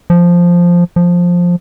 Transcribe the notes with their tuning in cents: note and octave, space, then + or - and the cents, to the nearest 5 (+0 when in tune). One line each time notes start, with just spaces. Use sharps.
F3 +0
F3 +10